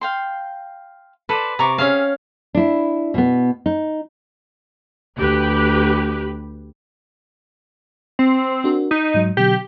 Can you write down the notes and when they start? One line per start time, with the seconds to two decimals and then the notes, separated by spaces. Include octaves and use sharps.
0.01 F5 G5 C6
1.29 A4 B4 C5 D5
1.59 C3 A#5 C#6 D6
1.78 C#4 G#4 E5 F5
2.55 D4 E4
3.14 B2 B3
3.66 D#4
5.17 D2 G4 B4
8.19 C4
8.64 D4 F#4 A#4
8.91 D#4 B6
9.14 G#2 F#3
9.37 B2 D3 F#3 G4